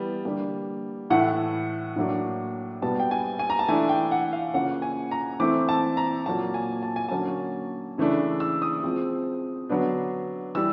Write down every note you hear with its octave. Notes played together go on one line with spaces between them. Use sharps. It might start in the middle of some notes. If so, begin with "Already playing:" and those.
Already playing: E3 G3 B3
D3 G3 A#3 D4
A2 E3 A3 F#5
A2 F#3 A#3 D4
B2 G3 B3 A5
G5
G#5
G#5
A#5
A5
E3 A3 D4 G#5
G5
F#5
F5
C#3 F3 A#3 C#4 F#5
G#5
A#5
E3 A3 C4 D6
A5
A#5
A#2 F#3 A#3 A5
G#5
A5
G#5
D3 F#3 A#3 C#4 A5
C#3 E3 A3 D4
E6
D#6
F3 G#3 C4
D3 F#3 B3 D4
E3 G3 E6